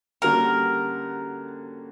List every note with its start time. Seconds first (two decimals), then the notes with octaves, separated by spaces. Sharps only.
0.22 D3 G3 A#3 C#4 F#4 A#4